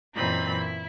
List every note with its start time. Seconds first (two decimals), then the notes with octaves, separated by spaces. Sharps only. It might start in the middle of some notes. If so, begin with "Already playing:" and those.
0.15 F#2 A#2 E3 C4 D#4 B5
0.58 E4